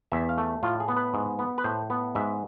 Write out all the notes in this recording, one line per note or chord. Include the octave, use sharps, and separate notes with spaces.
E2 E5
F5
A3
A2 F4
G#4
B3
B4
G#2
B3
B4
A2 C5
B3
G#2 E5